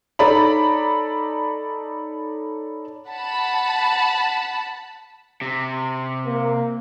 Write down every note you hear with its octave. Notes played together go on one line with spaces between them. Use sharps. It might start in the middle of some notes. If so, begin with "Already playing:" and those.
D#4 A4 C#5 D5 A#5 B5
F#5 A5 B5
C3
A#3